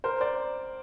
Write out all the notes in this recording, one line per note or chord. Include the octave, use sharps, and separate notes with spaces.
A#4 C5
C5 D5